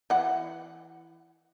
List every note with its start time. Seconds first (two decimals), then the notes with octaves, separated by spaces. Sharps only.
0.10 E3 F#5